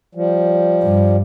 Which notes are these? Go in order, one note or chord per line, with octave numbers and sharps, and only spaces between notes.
F3 G3
G2